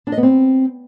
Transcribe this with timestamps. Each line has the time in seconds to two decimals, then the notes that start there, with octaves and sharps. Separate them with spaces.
0.07 D4
0.12 D#5
0.17 B3
0.23 C4